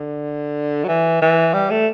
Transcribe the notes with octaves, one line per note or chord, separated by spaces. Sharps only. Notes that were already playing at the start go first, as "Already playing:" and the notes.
Already playing: D3
F#3
E3
E3
G3
A3